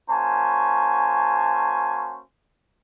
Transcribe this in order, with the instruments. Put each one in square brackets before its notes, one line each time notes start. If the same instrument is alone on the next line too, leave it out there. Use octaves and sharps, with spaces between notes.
[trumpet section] A#3 C#4 F#4 C5 G#5 A5